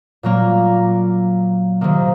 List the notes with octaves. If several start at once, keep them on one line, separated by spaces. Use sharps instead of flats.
A#2 F#3 A#3
C3 D#3 A#3